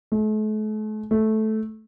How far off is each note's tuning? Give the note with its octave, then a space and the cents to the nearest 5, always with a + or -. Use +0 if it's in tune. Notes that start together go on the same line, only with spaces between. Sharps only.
A3 -40
A3 -10